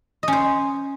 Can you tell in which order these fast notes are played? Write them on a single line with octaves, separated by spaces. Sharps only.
D#5 C#4 C5